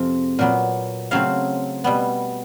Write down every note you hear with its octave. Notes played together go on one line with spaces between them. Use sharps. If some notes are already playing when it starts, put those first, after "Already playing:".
Already playing: F2 C3 F3 G#3 C4
A#2 F#3 B3
C#3 F#3 A3 C4 F5
B2 G3 B3